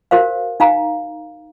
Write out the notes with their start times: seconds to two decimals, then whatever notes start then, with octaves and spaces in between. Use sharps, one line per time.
0.11 F#4 A#4 C5 F5
0.60 D#4 F5 A#5